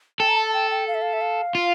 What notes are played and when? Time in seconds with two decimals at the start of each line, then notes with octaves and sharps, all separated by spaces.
0.20 A4 G5
0.29 A#5
0.37 A5
0.54 G5
0.71 G5
0.88 F5
0.94 E5
1.02 F5
1.13 E5
1.21 F5
1.55 F4